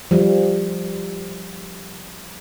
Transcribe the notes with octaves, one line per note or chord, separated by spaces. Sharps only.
F3 G3